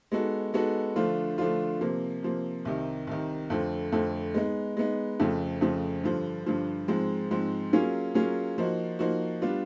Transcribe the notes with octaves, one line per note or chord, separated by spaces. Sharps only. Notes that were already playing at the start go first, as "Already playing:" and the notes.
G#3 B3 D#4 F#4 A4
G#3 B3 D#4 F#4 A4
D3 F3 A3 D4 F4
D3 F3 A3 D4 F4
C3 F3 A#3
C3 F3 A#3
C2 C3 D#3
C2 C3 D#3
F2 D3 F3 A3
F2 D3 F3 A3
G#3 B3 D#4
G#3 B3 D#4
F2 C#3 F3 A3
F2 C#3 F3 A3
G2 D3 F3
G2 D3 F3
G#2 F3 G#3 C4
G#2 F3 G#3 C4
F#3 A#3 C#4 F4 G#4
F#3 A#3 C#4 F4 G#4
F3 A#3 D#4 F#4
F3 A#3 D#4 F#4
G3 B3 D4 F4